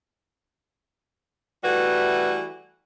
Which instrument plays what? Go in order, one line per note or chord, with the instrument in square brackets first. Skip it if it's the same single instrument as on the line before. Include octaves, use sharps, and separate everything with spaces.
[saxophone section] E3 G3 A3 F#4 B4